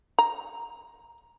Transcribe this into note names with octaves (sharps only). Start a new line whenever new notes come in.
A#5